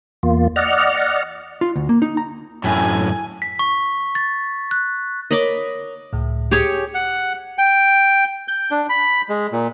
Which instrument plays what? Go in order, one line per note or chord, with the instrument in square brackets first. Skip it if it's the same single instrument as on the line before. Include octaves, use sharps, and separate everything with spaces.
[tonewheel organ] E2 A#3 F4
D5 D#5 F#5 F6
[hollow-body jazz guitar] F4
D2
A#3
D#4
A#5
[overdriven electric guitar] F#2 A2 [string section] G#5
[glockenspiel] B6
C#6
A6
F#6
[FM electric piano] A#4 C#5 [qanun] D#5 B5 D6
[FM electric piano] C#2 A2
[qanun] G4 G#4 C#5
[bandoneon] F#5
G5
G6
D4
B5
G#3
A#2